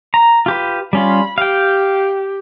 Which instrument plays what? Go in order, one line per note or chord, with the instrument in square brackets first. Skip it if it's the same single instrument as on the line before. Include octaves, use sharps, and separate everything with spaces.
[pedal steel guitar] A#5
F4 G4 B4
[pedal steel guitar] G3 C#4 F4 [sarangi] B5
[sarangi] G4 [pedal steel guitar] F5 G5